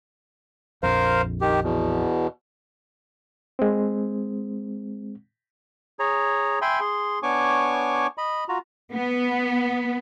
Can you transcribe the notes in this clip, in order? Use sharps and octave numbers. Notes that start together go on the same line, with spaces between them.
A#1 F2 A#4 C5 F5
D#3 G4
E2 B2
G#3 C4
G#4 C#5 A#5
E5 G5 G#5 B5 C6
G#4 C6
B3 D4 C#5 G#5 C#6 D6
D#5 B5
F4 F#4 A#5
B3